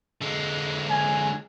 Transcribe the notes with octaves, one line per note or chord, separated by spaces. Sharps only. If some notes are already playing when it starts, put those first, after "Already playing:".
D3 G#3
G#5